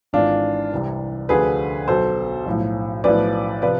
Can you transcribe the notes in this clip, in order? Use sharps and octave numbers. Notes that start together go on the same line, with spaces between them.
G#1 G#2 E3 D4 F4
C2 C3 E3
D2 D3 F3 G#4 B4
B1 B2 A4 C5
B1 A2 F3
B1 A2 F3 B4 D5
C3 F3 B4 D5